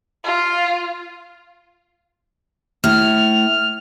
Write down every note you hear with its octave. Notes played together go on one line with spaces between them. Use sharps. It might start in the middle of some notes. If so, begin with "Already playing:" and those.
F4
A2 F6